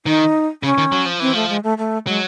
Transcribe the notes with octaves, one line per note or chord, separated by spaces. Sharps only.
D#3 D#4
C#3 C#4
D#3
F#3
F3
E3 C4
F3 A3
G#3
A3
A3
F#3 G#3